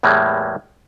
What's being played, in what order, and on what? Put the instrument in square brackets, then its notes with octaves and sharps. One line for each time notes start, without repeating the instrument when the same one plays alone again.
[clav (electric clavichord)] E2 A2 E3 G3 G#3 A#3